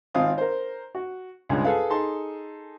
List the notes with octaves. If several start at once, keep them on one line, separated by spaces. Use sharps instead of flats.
G#1 C4 F4 F5 D#6
A#4 C5
F#4
C#2 G2 G#3
G#4 A4 B4 F5
D#4 G#4 A4 A5 C6